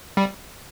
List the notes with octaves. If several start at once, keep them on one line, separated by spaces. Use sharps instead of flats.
G3